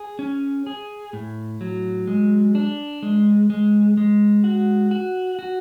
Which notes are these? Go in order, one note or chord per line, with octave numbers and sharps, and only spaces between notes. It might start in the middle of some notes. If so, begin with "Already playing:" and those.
Already playing: G#4
C#4
G#4
A2
F#3
G#3
D4
G#3
G#3
G#3
F#4
F#4
F#4